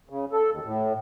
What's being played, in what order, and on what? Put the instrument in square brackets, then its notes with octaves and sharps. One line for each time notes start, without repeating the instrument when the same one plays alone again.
[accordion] C#3
A4
D#2
A2